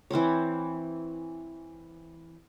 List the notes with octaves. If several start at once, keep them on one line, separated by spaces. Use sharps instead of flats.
E3 C4 C5 C#5